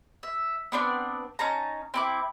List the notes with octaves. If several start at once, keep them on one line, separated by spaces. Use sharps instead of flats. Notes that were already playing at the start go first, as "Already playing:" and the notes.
E5
B3 C4 D4 D5
C#4 D#4 A5 A#5
C4 E4 D6